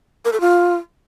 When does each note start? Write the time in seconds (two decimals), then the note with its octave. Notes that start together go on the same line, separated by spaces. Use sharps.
0.25 A#4
0.33 A4
0.40 F4